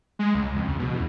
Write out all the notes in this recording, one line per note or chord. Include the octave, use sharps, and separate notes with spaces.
G#3
C#2
F2
C#2
B2
E2